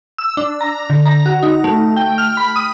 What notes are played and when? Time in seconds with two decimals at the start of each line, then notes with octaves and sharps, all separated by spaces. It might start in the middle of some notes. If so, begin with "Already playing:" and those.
0.18 E6
0.37 D4
0.61 A#5
0.90 D3
1.06 A#5
1.26 F#4
1.43 D#4
1.64 A3
1.96 G5
2.18 F6
2.37 B5
2.56 D#6